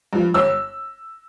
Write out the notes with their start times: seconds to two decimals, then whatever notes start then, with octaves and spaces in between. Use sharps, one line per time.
0.13 G2 F3
0.34 G1 E6